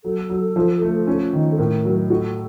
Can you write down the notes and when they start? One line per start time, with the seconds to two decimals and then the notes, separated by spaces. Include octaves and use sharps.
0.04 F#3 A4
0.29 F#3
0.56 F3
0.82 A3
1.07 C#4
1.33 D#3
1.52 A4
1.58 A2 A#4
1.85 F#3
2.10 F#4 A4